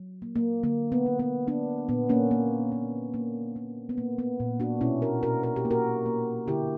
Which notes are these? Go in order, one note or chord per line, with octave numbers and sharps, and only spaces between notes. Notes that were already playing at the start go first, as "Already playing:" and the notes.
Already playing: F#3
A#3
A#3
D3 A#3
B3
A#3
B3
A#3 B3 D4
A#2 B3
A#3 C#4
A#3
A#3
A#3
A#3
B3
A#3
B3
A#2
D4 F#4
B2 C#4 E4
F#4 A#4
B2 F#4 A#4
A#4
G4
A#3
F#4 A#4
A#3
D3 E4 G4